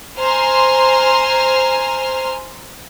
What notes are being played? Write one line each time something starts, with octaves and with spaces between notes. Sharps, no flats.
C5 G#5 A#5 C6 F6